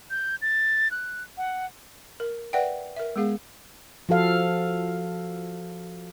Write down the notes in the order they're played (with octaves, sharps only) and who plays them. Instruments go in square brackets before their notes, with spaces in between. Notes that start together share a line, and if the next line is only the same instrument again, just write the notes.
[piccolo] G6
A6
F#6
F#5
[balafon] A#4
B4 D5 E5 F#5 G5
A#4 E5
G#3 B3 G#4 F5
[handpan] F3 F#4 A4 F5